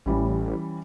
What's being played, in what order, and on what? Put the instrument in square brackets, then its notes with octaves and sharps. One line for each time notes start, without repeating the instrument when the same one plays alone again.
[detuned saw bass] A1 [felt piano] E3 G3 C#4